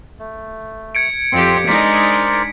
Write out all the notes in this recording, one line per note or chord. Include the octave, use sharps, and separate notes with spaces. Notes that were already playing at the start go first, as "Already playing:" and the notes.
A3
G#6 C#7 D7
F2 C4 G4 C6
G#3 D4 D#4 A#4 C5 D5 B6